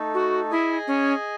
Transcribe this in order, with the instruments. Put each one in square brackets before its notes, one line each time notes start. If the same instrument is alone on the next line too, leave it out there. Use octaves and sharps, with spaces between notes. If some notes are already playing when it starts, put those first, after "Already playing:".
Already playing: [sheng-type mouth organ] A3 D#4 A4
[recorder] F#4
[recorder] E4 [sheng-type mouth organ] G#4 D#5 G#5
[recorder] C#4